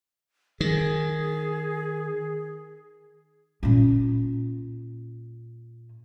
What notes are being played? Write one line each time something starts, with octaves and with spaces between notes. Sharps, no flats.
D#3 G#4
A#2 C#4